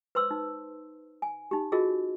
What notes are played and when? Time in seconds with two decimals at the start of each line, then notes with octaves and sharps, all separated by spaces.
0.15 B4 C5 C6 E6
0.31 D#4
1.22 G#5
1.51 D#4 G4
1.72 F4 F#4 G#4 A#4 D#5